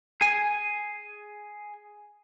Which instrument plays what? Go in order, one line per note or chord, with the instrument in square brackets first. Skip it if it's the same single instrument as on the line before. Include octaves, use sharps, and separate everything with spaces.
[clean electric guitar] G#4 G#5